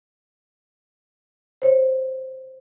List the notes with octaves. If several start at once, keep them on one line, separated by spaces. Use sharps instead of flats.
C5 C#5